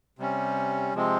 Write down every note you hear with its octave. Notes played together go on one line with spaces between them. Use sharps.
C3 G3 C#4
C3 F3 G#3 C4